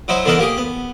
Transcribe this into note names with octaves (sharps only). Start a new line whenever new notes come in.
F#3 D#4 E4 C5
D3 E3 B3 D#4 A4 A#4
A#3 G4 G#4
B3